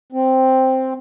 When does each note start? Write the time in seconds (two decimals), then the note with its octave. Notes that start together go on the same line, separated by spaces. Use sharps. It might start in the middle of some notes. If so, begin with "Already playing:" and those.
0.12 C4